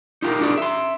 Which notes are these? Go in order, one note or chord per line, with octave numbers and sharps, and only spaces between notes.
D#4 F4 G4 A#4
D4 F#4 G#4 D5
E5 C6